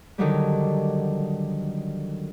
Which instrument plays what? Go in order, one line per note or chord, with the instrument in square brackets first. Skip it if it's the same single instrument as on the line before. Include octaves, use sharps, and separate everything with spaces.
[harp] D3 D#3 F#3 G3